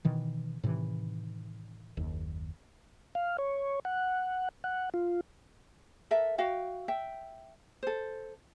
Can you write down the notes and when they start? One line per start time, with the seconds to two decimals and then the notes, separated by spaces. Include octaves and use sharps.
0.05 B2 D#3 E3
0.64 A2 C3 D#3 E3
1.97 F#1 D#2
3.15 F5
3.38 C#5
3.85 F#5
4.64 F#5
4.94 F4
6.11 A4 A#4 E5
6.38 F#4 F5 G5
6.88 E5 G5
7.83 A4 C5